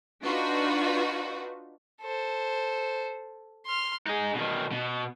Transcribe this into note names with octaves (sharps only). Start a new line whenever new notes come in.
D4 D#4 F4 F#4 B4
A4 C5
C6 F6
D#4 G#4
B2 D#3
B2